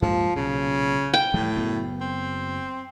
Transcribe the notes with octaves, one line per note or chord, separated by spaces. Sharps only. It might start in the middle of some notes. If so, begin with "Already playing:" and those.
G2 F3 G#3 A#3
B1 A#2 C#3
G5
A2 E3 F3 G3
F#1 B3
C4